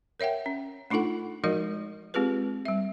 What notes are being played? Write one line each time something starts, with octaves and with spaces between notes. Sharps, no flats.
A#4 C#5 E5 F#5 G5
C#4
A3 D4 D#4 F4 A4 F#5
F3 G#3 D#4 F#4 A#4 D#5
G#3 C4 F4 G4 G#4 B4
G3 E5